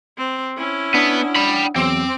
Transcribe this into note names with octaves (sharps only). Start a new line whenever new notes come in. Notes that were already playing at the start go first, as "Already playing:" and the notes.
C4
C#4 E4
B3 D4 F#5 D#6
G5 B5
E2 F#3 C4 D6 E6